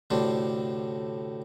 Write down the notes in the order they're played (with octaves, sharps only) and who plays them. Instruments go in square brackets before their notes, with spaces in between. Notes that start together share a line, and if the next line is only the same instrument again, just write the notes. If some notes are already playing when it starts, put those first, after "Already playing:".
[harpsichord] D2 A2 C3 D4 C5